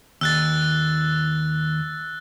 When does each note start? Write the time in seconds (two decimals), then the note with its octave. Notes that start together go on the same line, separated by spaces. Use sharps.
0.21 D#2 E6 F#6 A6